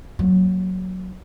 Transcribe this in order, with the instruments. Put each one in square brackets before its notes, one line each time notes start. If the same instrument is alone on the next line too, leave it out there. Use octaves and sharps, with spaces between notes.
[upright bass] F#3 A#3